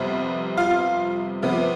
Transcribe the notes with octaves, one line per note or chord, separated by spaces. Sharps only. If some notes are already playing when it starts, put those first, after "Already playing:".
Already playing: F2 C3 G3 B3
F4 F5
C3 F3 B3